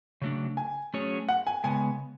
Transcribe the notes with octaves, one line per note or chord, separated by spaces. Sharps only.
C#3 F#3 A3 D4
G#5
F#3 A3 C#4 G#4 C#5
F#5
G#5
C#3 G#3 B3 G#5